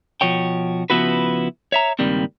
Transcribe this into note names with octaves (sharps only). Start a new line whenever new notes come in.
B2 F3 F#4 C#5 G5
C#3 F3 B3 E4 F#4 B4
C#5 E5 A#5
C#2 G2 D#3 G3 A#3 C4